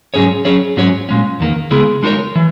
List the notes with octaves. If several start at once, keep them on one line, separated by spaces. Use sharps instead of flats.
G#2 F#3 C#4 G#4 C#5
F#3 C#4 G#4 C#5
G#2 F#3 C#4 F#4 C#5
A#2 G#3 C#4
E2 D#3 A#3
C#3 G#3 B3 E4 G#4
G#3 D#4 F#4 A#4 C#5
E3